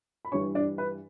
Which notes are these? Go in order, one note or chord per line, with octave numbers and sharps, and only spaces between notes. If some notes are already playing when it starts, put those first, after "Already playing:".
B5
G2 E3 G3 C#5 C#6
D4 D5
B4